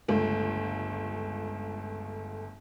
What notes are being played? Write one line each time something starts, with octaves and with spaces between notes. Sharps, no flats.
G1 C#2 A3